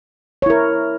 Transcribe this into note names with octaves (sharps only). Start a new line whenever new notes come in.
E4 A#4 C#5